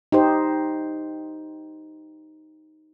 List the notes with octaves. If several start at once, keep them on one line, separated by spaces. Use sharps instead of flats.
D#4 G4 C5